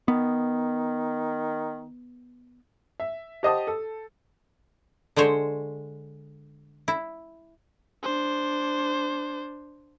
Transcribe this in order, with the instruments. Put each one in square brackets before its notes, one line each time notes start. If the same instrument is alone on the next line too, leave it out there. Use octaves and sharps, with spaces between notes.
[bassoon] D#3 [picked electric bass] B3
[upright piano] E5
G4 C5 D#5 F#5 A5 D#6
A4
[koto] D3 G#3 C5 C#5
E4
[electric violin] D4 C5